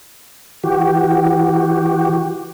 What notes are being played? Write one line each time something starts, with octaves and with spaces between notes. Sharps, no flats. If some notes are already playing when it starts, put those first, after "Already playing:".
E3 F#4 G4